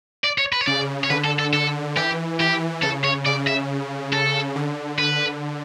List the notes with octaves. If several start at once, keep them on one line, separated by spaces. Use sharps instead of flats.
D5
C#5
B4
C#5
C#3 D5
C#5
D3 B4
A4
A4
D3 A4
E3 G4
E3 G4
C#3 A4
C#5
C#3 D5
E5
A4
D3
B4